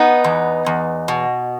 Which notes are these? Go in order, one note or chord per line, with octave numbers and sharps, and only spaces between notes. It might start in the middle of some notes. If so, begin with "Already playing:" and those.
Already playing: B3 D#4
E2
E2
B2